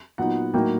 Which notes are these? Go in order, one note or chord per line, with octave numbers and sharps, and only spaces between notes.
A#2 F#3 B3 D#4 F#5
A2 F#3 A#3 D#4 G5